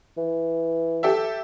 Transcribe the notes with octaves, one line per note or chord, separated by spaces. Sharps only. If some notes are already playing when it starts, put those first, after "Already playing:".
E3
G4 A4 E5